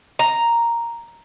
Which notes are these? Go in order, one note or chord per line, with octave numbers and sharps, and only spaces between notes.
A#5